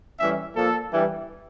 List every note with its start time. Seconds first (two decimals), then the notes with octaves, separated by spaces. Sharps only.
0.20 A2 E3 G3 C#4 E5
0.56 A#2 F3 A#3 A4
0.92 G2 E3 G3